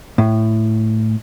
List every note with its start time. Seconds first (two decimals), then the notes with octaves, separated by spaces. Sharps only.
0.18 A2